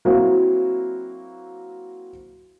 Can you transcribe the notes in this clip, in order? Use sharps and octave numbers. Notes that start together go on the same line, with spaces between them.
F#3 A#3 C4 E4 F#4